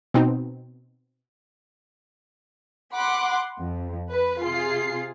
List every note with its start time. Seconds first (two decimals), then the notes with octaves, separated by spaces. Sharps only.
0.14 B2 C4 D#4
2.93 F#5 B5 C6 D6
3.60 F2
4.10 B4
4.40 C3 F4 G#4 C7